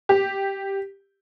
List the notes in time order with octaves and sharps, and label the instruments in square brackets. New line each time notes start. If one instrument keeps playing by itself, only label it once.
[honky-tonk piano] G4